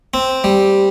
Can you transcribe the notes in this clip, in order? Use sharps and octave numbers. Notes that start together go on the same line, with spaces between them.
C4
G3